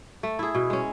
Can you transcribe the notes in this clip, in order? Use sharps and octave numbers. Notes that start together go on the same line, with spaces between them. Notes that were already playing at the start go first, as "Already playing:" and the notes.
A3
E4 G#4
B2
G#3 C#4